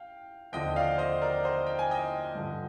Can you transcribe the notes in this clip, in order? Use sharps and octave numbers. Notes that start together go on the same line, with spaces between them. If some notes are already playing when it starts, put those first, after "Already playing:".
Already playing: F5 G5
D#2 D3 F3 C4 D#5 G5
D5 F5
C5 D#5
A#4 D5
C5 D#5
G5
G#5
D#5 G5
G2 D3 F3